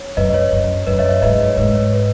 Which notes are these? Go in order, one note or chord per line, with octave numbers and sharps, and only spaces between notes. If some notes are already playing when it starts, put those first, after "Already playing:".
Already playing: C#5
F#2 B4 D#5
C#5
F#2
F#2 B4 D#5
C#5 E5
C#5 E5
G#2 B4 D#5
C#5
G#2 B4
C#5
B4 D#5